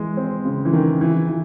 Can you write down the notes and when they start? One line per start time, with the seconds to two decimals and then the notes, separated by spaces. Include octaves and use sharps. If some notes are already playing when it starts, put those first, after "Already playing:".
Already playing: E3 G#3
0.17 C4
0.45 C#3
0.65 E3
0.73 D#3
1.01 E3
1.28 E3